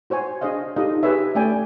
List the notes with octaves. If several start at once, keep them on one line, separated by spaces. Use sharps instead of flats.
F#4 C5 C#5 G#5
D4 G#4 C5 D#5 F5
D#4 F4 G4 A4 D#5 F5
G4 G#4 B4 C#5 E5
G4
A3 C#4 D5 G5 G#5